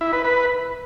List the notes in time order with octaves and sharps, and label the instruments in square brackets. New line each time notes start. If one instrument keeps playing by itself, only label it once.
[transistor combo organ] E4
B4
B4